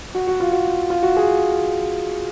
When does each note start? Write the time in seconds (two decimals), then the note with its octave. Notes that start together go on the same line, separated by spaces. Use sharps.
0.14 F#4
0.27 F#4
0.40 F4
0.52 F#4
0.90 F4
1.03 F#4
1.16 G#4